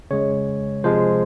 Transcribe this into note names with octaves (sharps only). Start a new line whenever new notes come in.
C#3 G#3 C#5
C3 F3 G#3 C5